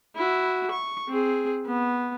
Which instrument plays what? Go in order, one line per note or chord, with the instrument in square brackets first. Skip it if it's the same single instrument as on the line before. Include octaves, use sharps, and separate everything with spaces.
[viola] E4 F#4
C#6
C4 G#4
B3